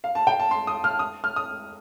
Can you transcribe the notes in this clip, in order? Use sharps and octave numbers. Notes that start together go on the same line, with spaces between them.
F5
A5
G5
A5
C6
D#6
F6
D#6
F6
D#6